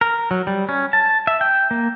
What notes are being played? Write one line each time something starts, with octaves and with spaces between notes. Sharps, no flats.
A#4
F#3
G3
C#4
A5
E5
G5
A#3